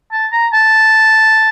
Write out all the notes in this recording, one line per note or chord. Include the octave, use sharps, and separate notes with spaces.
A5
A#5
A5